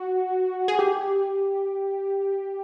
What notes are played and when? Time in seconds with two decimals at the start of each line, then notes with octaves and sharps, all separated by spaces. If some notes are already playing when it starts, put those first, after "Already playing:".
Already playing: F#4
0.68 G#4
0.79 G4